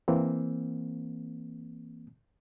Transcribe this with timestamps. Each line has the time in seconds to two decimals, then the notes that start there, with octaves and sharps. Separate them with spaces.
0.08 E3 A#3 C4